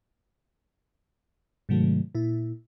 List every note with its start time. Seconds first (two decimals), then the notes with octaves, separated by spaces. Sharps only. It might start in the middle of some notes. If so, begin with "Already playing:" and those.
1.69 G#2 C3 D#3 F#3 A3
2.15 A#2 E4